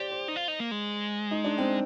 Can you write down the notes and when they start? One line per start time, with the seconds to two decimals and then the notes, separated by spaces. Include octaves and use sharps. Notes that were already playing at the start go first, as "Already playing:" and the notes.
Already playing: G4 C5 D5
0.12 C5
0.28 D#4
0.36 F4
0.48 D#4
0.60 A#3
0.71 G#3
1.31 D#4
1.44 D4
1.58 C4